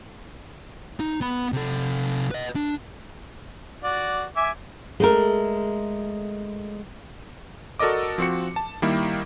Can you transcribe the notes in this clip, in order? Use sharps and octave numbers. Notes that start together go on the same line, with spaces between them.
D#4
B3 B5
C3 A4
B4 D#5
D4
F#4 D5
E5 G#5 D6
G#3 A3 A#4
F#4 A4 A#4 D5 D#5 D6
F3 C4 F#4 C#7
A5
D#3 G3 A#3 E4